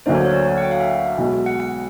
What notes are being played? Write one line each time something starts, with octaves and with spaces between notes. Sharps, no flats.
D2 D3 F#3 A#3 D4 C5
C#5
C#5
D5
C#5
F#5
G5
F5
E5
B1 B2 G#3
F#5
F#5